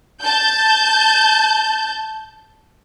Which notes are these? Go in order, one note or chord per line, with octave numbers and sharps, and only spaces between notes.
A5 G6